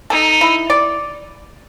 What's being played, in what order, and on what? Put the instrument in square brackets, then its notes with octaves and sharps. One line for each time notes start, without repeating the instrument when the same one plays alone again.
[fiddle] D#4 [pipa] A4
[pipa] E4
D5